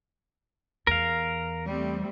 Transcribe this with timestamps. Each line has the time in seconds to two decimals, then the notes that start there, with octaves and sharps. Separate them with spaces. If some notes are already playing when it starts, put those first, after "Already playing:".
0.87 E2 A#4 F5
1.65 G3 A3 C4